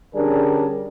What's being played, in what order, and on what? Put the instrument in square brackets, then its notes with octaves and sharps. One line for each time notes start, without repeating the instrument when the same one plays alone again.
[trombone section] D3 G3 C#4 D4 G#4 A#4